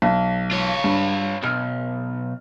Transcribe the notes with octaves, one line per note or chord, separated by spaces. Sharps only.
B1
F4 C#5
G2
B1 F6